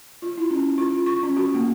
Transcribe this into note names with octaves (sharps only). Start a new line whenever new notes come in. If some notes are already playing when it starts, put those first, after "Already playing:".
F4
E4
C#4
F4
C#6
C#4
F#4
A#3